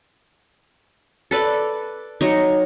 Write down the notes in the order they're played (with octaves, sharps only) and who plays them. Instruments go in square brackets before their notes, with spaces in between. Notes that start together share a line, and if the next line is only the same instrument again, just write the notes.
[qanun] A4 B4 D5
F#3 D#4 C#6